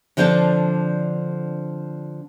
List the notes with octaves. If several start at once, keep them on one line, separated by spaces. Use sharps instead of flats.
D3 F3 C4 D4 A4